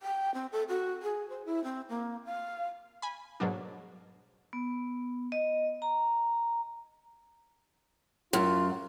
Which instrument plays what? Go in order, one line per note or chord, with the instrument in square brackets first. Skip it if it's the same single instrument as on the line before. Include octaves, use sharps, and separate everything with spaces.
[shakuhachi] G5
C4
A4
F#4
G#4
C5
E4
C4
A#3
F5
[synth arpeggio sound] G#5 B5
G#2 B2 F#3 A#3 D4
[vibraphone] B3
D#5
A#5
[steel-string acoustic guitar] F#2 [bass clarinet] F4